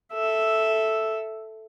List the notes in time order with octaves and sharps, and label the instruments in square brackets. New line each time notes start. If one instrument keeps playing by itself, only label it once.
[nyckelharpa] A4 E5